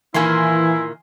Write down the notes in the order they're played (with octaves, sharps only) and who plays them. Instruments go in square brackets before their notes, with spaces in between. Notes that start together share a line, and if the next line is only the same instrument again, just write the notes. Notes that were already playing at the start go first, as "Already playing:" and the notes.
[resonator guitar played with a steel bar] A#2 D#3 A#3 [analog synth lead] E3 [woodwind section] E4 [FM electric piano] G#5 C6